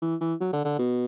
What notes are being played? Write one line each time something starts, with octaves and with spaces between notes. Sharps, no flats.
E3
E3
F#3
D3
D3
B2